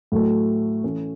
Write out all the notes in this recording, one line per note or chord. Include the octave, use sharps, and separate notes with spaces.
A2 F#3 A3
E3 A3 C#4